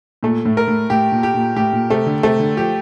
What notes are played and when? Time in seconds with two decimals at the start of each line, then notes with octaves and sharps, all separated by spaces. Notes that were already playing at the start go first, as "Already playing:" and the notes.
0.23 A#2 A3
0.45 A2
0.57 A#4
0.68 A2
0.90 A2 G4
1.12 A#2
1.23 G4
1.34 A#2
1.56 A2 G4
1.73 A#2
1.90 C3 A3
2.06 D3
2.23 C3 A3
2.40 D3
2.57 F3 G4